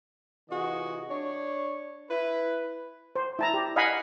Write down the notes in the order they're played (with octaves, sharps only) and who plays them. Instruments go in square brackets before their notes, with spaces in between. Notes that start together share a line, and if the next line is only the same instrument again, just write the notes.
[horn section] C3 E3 F4 F#4 G#4 D#5
D4 C#5
E4 B4
[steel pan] C5
E4 A5 A#5
G4
D#5 F5 F#5 G#5 B5